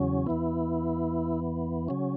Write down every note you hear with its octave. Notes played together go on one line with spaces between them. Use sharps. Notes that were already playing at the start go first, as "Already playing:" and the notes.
Already playing: E2 C#3 F#3 C#4
E2 E3 B3 E4
C#3 F#3 C#4